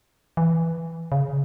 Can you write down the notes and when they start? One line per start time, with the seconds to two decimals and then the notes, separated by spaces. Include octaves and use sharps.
0.37 E3
1.12 C#3